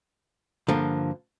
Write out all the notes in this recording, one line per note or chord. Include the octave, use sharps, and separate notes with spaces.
G2 D3 F3 A#3